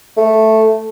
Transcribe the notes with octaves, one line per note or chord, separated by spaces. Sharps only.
A3